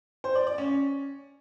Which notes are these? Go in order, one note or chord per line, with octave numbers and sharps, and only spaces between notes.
C5
D5
D5
C#4